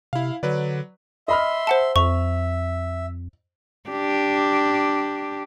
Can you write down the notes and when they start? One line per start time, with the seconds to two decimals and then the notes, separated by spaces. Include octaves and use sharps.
0.13 C3 E4 F5
0.43 D3 F#3 B4 D5
1.28 D#5 E5 B5 C6 F6
1.67 C5 F#5 A5
1.96 F2 E5 C#6 F7
3.90 D4 G4